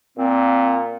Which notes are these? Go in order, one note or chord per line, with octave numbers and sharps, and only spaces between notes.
A#2 C4